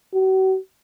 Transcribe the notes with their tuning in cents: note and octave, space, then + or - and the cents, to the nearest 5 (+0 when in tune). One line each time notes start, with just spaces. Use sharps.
F#4 +40